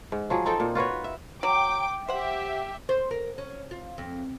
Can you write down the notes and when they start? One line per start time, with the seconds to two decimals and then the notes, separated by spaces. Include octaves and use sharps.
0.12 G#2
0.30 F3 F#3 G#4
0.45 C4 D#4 A4 G5
0.60 A#2
0.75 F4 F#4 B4 C#5
1.04 E5
1.43 F#3 G5 D6
2.08 G4 C5 E5 F#5
2.89 C5
3.11 A#4
3.38 C#4
3.71 F4
3.98 F2